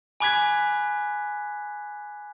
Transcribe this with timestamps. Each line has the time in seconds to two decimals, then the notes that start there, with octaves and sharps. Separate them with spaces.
0.20 G#5 B5 D6 F#6 G#6 B6